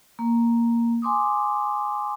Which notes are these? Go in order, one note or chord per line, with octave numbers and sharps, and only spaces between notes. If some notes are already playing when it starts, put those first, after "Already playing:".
A#3
G#5 C6 D6 D#6